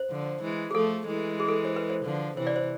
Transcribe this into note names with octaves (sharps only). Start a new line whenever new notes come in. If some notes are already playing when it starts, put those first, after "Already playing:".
Already playing: C5
D3 F3
E3 G#3
G#4
F3 A3 A4
E3 G#3
G#4
A4
C5
B4
C5
D3 F3
C3 E3 C5
D5
C5